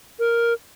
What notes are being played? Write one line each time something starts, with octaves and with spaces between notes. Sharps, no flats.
A#4